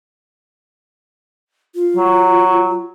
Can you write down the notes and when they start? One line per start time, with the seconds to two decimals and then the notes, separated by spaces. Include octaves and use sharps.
1.75 F4
1.97 F#3